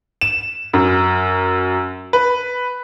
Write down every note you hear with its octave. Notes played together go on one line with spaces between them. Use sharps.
E7
F#2
B4